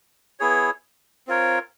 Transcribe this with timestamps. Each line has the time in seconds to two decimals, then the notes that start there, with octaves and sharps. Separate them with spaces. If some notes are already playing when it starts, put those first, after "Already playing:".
0.40 B3 E4 G#4 C#5
1.27 C4 F4 A#4 C#5